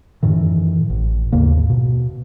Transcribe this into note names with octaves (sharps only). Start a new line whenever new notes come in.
F#2 A2 D#3 E3
A1
D#2 G#2 C#3 A#3
G#2
B2